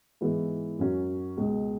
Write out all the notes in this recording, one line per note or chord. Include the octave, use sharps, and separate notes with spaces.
G#2 E3 B3 E4 G#4
F#2 F#3 C#4 F#4
C#2 B2 G#3